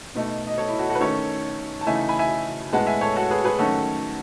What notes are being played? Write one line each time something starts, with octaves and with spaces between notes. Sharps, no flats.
B2 A3 D#4
D#5
A4 C#5
E4
F#4 A4
F#4 A4
B4
D#3 A3 C#4 A4 C#5
A5
C#3 E3 A3 D#4 E5 G#5
G#5 B5
E5 G#5
A2 G#3 B3 F#5 A5
E5 G#5
A4 C#5
F#4 A4
G#4 B4
G#4 B4
D#3 F#3 A3 C#4 F#4 A4